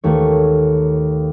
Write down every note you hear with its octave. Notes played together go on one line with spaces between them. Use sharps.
D#2 A3 C#5